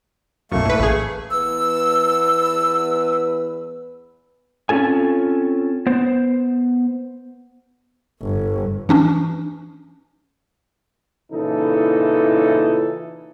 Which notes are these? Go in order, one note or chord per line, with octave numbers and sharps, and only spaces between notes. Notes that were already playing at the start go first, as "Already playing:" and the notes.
B1 F#2 A3 A#3 C#6
A2 B4
A1 G#4
E2 B3 B4 E6
C4 C#4 F4 A4 G#5
B3 C5
G1
E3 C#4 D4
A#2 C#3 E3 D#4 E4 A4